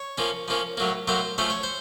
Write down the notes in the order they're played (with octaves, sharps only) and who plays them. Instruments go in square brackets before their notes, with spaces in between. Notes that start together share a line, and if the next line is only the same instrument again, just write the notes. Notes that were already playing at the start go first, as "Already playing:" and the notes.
Already playing: [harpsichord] C#5
F3 A#3 C#4
F3 A#3 C#4
A2 F#3 A#3
A2 F#3 A#3 C5
F3 A3 C#4 C5
C#5
C5